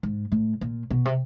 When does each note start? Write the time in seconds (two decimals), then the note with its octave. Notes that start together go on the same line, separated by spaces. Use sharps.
0.03 G#2
0.32 A2
0.61 A#2
0.90 B2
1.05 C3